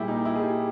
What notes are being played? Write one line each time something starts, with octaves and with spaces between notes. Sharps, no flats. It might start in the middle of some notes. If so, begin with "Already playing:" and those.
Already playing: A#2 G3 E4 G4 G#4
D#4
E4
G#4
G4